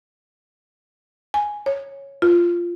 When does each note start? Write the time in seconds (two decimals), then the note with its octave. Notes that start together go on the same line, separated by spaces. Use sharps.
1.34 G#5
1.66 C#5
2.22 F4